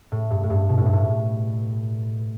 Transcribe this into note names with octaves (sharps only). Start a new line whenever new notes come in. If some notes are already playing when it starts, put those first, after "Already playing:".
A2
G2
A2
G2
B2
A2
G2
A2